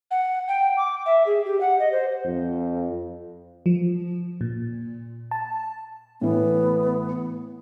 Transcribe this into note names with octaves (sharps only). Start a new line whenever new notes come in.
F#5
G5
D6
E5
G#4
G4
F#5
D#5
C5
F2
F3
A#2
A5
A2 E3 B3